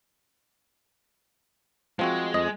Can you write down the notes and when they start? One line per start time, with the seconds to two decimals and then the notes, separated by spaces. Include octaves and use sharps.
1.99 F3 G#3 C4 F#4
2.34 F2 D#5